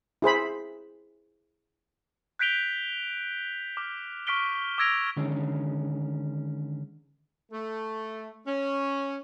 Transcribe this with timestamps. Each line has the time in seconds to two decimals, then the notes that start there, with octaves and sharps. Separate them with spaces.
0.22 E4 G#4 C5 B5
2.39 F#6 G6 B6 D7 F7 G7
3.77 D6 F6
4.27 C#6 F6 B6 D7 G7
4.78 D6 E6 G#6 A#6 D7 F7
5.17 D3 D#3 G#3 C#4
7.52 A3
8.46 C#4